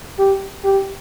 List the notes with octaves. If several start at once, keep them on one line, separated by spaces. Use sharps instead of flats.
G4
G4